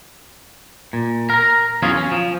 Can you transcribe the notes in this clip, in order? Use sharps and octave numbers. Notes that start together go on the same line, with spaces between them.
A#2
A#4 A#5
E2 F#3 C#4 F4 G#4
C#4
F3